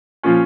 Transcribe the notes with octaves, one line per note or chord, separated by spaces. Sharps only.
A#2 F3 C#4 F4